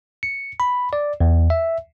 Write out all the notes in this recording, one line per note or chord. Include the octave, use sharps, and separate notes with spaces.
C#7
B5
D5
E2
E5